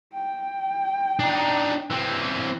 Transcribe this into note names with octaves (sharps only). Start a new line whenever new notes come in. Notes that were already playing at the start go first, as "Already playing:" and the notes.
G5
D4 D#4
E3 C4